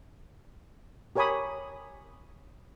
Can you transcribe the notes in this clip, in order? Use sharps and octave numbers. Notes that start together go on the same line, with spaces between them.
G4 A#4 C#5 G#5 B5 D#6